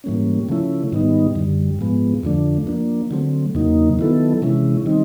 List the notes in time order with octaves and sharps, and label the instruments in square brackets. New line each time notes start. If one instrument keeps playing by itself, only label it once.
[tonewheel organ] G#2 E3 G3 A#3 C#4
C#3 F3 A3 C#4 E4
G#2 D#3 G3 B3 D#4
F#2 D3 G3
G#2 F3 G#3 B3
F2 D3 F3 A3 D4
F3 A#3 D4
D3 F#3 A3 C4
E2 C#3 F#3 A#3 D#4
D#3 F#3 B3 E4 A4
C3 E3 G#3 C#4 E4
D#3 G3 C4 D#4